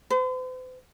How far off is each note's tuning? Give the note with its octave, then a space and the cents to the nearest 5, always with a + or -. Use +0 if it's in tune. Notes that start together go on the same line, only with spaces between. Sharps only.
C5 -45